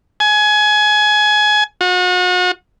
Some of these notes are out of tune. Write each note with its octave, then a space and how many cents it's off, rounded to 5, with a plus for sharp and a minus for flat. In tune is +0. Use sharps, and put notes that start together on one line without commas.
G#5 +25
F#4 -40